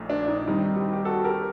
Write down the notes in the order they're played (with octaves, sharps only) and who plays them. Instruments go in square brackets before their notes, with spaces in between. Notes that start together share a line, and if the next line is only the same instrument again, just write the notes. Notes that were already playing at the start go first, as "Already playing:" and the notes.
Already playing: [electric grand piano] A#1 A#2 A3 D#4
[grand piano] D4
D#4
[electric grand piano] G2 D#3 G3 C4 [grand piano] D#4
[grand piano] D#4 G4
G4
F#4 A4
G4 A#4